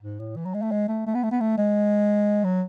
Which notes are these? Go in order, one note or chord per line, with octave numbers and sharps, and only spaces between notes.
G#2
A2
E3
F#3
G#3
A3
G#3
A3
A3
B3
A3
B3
A3
G#3
F#3